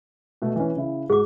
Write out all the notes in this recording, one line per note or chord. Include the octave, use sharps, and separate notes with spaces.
B2 A3
E3 C#4
C#3 E4
G#2 F#4 G#4 D6